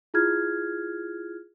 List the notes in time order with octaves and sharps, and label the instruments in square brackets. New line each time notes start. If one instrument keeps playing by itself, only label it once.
[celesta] E4 F4 G#4 F6 G#6